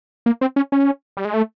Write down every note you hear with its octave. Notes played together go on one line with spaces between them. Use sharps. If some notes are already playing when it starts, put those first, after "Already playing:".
A#3
C4
C#4
C#4
G3
G#3
A3